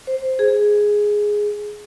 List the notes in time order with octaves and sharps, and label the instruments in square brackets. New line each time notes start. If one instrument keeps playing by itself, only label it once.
[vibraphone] C5
G#4